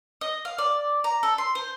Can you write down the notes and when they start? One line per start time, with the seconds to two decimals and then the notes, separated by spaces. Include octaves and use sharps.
0.21 D#5
0.45 F5
0.58 D5
1.04 A#5
1.23 A4
1.38 C6
1.55 C5